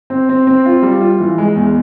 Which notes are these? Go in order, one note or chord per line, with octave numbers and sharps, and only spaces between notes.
C4
C4
C4
F4
G3
F4
E3
G#3
E2